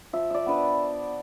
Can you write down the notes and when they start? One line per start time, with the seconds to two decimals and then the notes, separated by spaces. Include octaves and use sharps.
0.13 F3 E5
0.31 D5 E5
0.46 B3 D4 B4